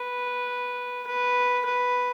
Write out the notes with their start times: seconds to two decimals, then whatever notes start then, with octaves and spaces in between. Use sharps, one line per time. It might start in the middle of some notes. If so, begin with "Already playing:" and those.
Already playing: B4
1.07 B4
1.65 B4